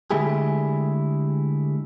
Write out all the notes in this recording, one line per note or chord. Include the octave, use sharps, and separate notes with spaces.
D3 G#3 A3 E4 G4 G#4